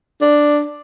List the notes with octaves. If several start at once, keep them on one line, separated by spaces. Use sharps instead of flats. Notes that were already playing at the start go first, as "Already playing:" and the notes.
D4